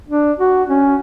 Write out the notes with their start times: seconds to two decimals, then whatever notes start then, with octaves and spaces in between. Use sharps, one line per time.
0.08 D4
0.39 F#4
0.69 C#4